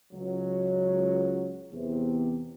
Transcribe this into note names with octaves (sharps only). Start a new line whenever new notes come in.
C#2 F#3
E2 C3